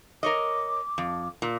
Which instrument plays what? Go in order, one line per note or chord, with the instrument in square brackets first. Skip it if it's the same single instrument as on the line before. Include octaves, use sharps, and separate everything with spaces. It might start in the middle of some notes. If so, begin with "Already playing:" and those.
[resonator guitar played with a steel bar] A#4 C#5 D#5 [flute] D6
[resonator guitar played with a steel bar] F2
A#2